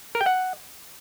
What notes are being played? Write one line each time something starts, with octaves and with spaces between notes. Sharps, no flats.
A#4
G5
F#5